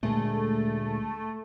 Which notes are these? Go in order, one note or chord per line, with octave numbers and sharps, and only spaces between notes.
D2 A#2 G#3 A3